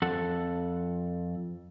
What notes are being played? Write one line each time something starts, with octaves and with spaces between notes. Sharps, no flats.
F2 A4 F#5